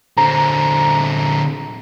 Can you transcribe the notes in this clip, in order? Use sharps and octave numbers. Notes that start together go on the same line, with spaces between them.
D3 C4 A#5